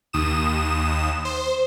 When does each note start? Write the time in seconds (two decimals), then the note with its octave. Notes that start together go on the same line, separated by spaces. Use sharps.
0.13 D#2 D#6 E7
1.25 C5